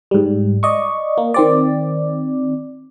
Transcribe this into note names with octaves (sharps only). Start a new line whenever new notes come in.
G#2 G3
D5 D#5 C#6
A#3
D#3 C4 D5